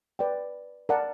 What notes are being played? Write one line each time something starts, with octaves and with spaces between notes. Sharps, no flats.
B4 D5 G5
A#4 D5 F#5 A5